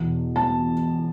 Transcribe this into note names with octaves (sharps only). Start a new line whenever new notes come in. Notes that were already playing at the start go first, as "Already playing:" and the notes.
Already playing: E2 B2
A5